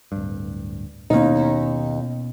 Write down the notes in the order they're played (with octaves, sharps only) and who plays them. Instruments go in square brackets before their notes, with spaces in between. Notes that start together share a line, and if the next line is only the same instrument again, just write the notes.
[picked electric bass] D1 G2
[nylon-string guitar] D#2 D#4 [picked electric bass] B2 B3 C#4